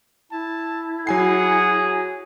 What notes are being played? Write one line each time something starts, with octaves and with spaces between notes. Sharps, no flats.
E4 A5
F#3 G#4 F#5 G#5 C7